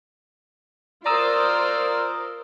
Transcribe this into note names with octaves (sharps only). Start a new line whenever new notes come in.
F4 A#4 C5 D5 A#5 D#6 E6